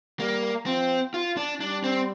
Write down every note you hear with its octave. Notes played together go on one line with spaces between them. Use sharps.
G3 A#3
F3 C4
F4
D4
G3 D4
C4